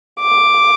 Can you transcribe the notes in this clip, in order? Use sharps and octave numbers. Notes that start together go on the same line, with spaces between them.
D6